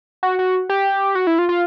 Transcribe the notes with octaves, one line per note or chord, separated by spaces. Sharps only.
F#4
F#4
G4
F#4
E4
F4
F4